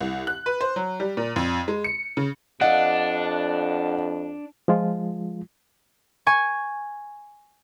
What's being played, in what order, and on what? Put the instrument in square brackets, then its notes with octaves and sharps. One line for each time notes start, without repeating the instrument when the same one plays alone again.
[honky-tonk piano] C2
F#6
B4
C5
F#3
G3
A#2
F2
G#3
C#7
C#3
[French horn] F2 [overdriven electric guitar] D4 [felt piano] D#5 F5 [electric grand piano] F#5
[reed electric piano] F3 G#3 F4
[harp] G#5 C#6 G#6